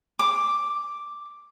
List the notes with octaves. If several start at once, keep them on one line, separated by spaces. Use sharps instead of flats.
D6